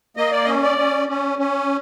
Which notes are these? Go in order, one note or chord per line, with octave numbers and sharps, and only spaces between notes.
A#3 D#5
D5
D#5
C#4
D5
C#4
C#4
C#4